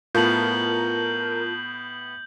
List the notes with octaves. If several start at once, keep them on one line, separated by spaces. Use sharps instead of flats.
A2 B3 F4 A#4 A5 G6 F#7